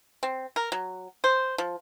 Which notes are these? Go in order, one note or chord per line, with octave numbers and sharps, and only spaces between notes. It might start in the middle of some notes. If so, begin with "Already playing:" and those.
C4
A#4
F#3
C5
F3